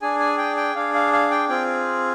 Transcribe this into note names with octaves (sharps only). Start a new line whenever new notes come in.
D4 G#4 G#5
G#5
G5
G5
D4 G#4 F5
F5
F5
G5
C4 F4 G#4 G5